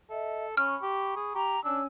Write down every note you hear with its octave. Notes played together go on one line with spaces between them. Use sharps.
A4 D#5 E5
C#4 B5 C#6 F6
G4
G#4
G4 A#5
C#4 D4 C#5 G#5 E6